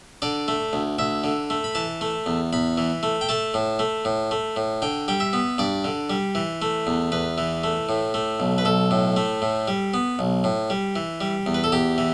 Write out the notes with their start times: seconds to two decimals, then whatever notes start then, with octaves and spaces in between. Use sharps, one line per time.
0.22 D3 D5
0.48 A3
0.73 D2
0.99 D2 E5
1.24 D3
1.50 A3
1.64 B5
1.75 E3 A5
2.01 A3
2.26 E2
2.53 E2 B5
2.78 E3
3.03 A3
3.21 G5
3.29 A3 A5
3.54 A2
3.79 A3
4.05 A2
4.31 A3
4.56 A2
4.82 D3 G5
5.08 G3 G5
5.20 E5
5.33 B3
5.58 G2 D5
5.84 D3
6.10 G3
6.35 E3
6.62 A3
6.87 E2
7.12 E2 B4
7.38 E3
7.64 A3
7.89 A2
8.14 A3
8.40 B1
8.58 B4
8.65 B1 A4
8.91 A2
9.16 A3
9.42 A2
9.68 G3
9.94 B3
10.19 B1
10.44 A2
10.70 G3
10.96 E3
11.21 G3
11.46 E2
11.54 B4
11.64 A4
11.72 E2 G4
11.98 E3